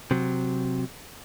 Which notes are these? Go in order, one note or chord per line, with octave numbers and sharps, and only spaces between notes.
C3 F#3